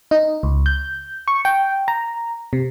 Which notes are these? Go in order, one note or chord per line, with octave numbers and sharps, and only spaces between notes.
D#4
C#2
G6
C#6
G5
A#5
C3